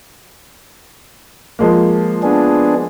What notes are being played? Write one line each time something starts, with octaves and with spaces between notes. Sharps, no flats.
F3 G#3 A#3
B3 D4 G#4